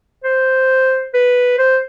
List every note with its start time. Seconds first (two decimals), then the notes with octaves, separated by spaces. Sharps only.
0.24 C5
1.14 B4
1.58 C5